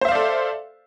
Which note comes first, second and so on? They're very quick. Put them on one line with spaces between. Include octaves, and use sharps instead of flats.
C5 E5 F5 D5 A4